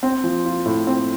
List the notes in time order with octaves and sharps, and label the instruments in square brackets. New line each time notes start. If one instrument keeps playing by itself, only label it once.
[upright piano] C4
F3
F4
A2
C4